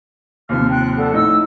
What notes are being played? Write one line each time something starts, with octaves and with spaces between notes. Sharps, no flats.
D#2 C3 F3 C6 F6
G5 C6 F#6
A4 D5 F#5
A2 D#4 E6